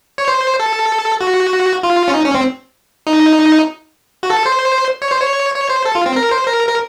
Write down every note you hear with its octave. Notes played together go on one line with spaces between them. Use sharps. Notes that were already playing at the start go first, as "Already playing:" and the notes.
C#5
C5
A4
F#4
F4
C#4
D#4
C#4
C4
D#4
F#4
A4
C5
C#5
C5
C#5
C#5
C5
A4
F4
C4
A#4
C5
A#4
A#4